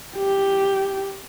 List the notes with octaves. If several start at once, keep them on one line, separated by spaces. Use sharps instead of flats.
G4